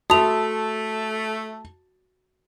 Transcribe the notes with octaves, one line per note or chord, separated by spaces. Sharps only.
A3 F#4 A5 D#6 F7